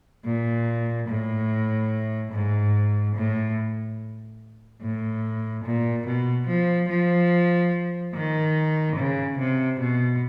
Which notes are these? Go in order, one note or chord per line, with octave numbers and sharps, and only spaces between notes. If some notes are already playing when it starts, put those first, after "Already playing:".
A#2
A2
G#2
A2
A2
A#2
B2
F3
F3
D#3
C#3
C3
B2